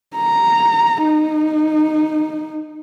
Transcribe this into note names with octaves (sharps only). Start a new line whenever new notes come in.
A#5
D#4